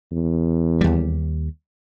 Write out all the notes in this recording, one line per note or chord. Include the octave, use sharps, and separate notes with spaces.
E2
D#2 G3